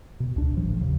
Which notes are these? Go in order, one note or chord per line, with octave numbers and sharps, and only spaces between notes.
B2
C#2 D4
A2 F3
A1 F3
D#2 C#3